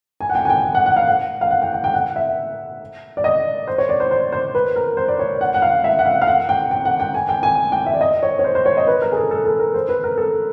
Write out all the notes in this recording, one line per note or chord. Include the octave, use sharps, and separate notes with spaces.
G#5
F#5
G5
G#5
G5
G5
F#5
F#5
F5
F#5
F5
F#5
G5
G5
G5
F#5
E5
D5
D#5
C5
C#5
D5
C5
C5
C5
B4
A#4
C5
D5
C#5
F#5
F#5
F5
E5
F#5
F5
F5
F#5
G5
G5
F#5
G5
G#5
G5
G#5
G5
E5
D5
D#5
C#5
C#5
C5
C5
C#5
D#5
B4
A#4
G#4
A4
A4
A4
A#4
C5
B4
A#4
A4